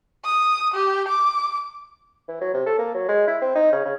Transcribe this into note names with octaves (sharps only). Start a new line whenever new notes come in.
D#6
G4
D6
E3
F#3
C3
A4
A#3
F#3
G#3
E4
C4
D#4
C#3
C#3